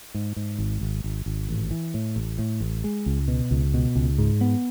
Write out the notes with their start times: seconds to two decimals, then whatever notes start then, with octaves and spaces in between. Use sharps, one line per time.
0.14 G#2
0.36 G#2
0.58 G#1
0.81 G#1
1.04 G#1
1.26 G#1
1.49 A1
1.71 E3
1.94 A2
2.16 A1
2.38 A2
2.60 A1
2.84 G#3
3.06 C#2
3.28 B2
3.51 C#2
3.74 B2
3.95 C#2
4.18 G#2
4.41 B3